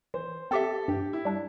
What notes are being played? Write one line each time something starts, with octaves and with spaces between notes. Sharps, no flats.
E3 C5
C4 G4 A4 E5
G2 G4
E4
G3 D4